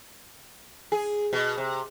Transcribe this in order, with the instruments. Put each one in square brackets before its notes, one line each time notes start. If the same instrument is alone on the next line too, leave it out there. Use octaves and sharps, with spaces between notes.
[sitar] G#4
B2
C3